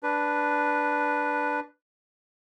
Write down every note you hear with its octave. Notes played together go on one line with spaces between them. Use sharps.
D4 B4